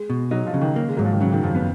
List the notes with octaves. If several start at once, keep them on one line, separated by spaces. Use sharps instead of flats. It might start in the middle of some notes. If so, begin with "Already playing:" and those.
Already playing: G#3
B2
F#3 D#4
F3
C#3
D#3
A#3
G#3
G#2 F#3
F3
D#3
C#3 F#3
D#3
F#2 F3
B3